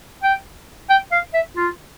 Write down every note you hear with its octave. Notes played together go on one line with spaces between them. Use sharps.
G5
G5
F5
E5
F4